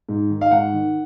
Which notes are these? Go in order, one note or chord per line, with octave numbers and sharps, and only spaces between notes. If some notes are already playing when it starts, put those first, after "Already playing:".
G#2
D#3
F5
G#2 F#5
D#3